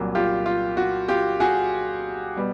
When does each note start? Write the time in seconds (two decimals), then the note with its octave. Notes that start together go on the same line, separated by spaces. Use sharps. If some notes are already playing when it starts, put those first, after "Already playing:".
Already playing: C2 A#2 F#3 A#3
0.15 F4 G4
0.46 F4
0.77 F#4
1.09 F4 G4
1.40 F#4 G#4
2.36 B2 G3 B3